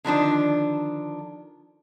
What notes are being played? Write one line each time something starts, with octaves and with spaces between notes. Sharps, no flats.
D3 D#3 F3 D4